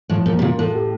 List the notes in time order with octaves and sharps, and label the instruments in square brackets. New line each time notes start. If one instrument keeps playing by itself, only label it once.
[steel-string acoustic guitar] A2 [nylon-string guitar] F3
[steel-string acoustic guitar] A#2 [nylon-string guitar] A#3
[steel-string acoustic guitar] C3
[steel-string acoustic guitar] A#2 [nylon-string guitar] F4
[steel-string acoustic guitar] A2 [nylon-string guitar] A4
[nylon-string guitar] G4